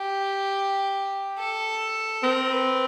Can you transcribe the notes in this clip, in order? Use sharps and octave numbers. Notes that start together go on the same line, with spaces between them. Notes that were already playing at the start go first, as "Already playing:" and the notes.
Already playing: G4
A4
C4 A#4
B4